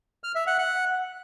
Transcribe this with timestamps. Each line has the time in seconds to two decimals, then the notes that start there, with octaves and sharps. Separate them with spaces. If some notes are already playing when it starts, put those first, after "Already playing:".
0.24 F6
0.35 E5
0.47 F#5
0.59 F#5